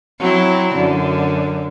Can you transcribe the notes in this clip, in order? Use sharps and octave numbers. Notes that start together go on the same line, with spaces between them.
F#3 C4 E4
F#2 D3